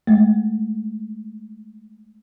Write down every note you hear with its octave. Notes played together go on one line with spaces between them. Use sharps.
G#3 A3